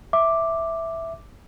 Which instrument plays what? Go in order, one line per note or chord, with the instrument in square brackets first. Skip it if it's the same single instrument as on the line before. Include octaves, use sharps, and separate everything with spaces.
[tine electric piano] E5 [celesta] D6